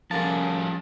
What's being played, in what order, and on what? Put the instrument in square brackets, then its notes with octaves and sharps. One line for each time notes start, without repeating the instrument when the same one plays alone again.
[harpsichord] D3 A#3 F4 [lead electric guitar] F3 G3 [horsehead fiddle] C#4 [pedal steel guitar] A5